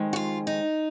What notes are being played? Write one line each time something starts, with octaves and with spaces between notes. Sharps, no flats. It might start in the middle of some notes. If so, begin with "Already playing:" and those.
Already playing: F2 D#3 G#3
F#4
F4
D#4